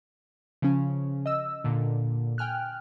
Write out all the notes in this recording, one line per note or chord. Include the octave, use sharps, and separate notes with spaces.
C#3 F3 C#4
D#5 E6
A#2 D3
G5 G#5 F6 F#6